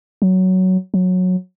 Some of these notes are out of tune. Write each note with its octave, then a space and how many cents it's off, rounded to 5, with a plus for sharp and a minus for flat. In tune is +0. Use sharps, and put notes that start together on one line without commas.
F#3 +10
F#3 -15